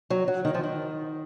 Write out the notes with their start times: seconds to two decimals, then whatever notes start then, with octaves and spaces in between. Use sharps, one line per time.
0.10 F#3
0.28 F#3
0.45 D#3
0.54 F3
0.63 D#3